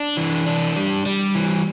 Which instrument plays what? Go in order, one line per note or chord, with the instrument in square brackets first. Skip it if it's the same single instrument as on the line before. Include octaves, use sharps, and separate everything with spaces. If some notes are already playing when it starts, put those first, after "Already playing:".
Already playing: [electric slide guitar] D4
E3
D4
G3
G3
E3